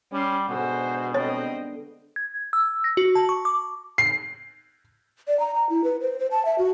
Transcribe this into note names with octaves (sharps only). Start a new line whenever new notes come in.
G3 C#4 C6
G#2 B2 D3 F#4 C5 G#5
D3 G3 B3 C4 C#5 D#5
G#6
E6
A#6
F#4
A5
C#6
D6
C7
D5
A#5
A#5
E4
B4
C5
C5
A5
E5
F#4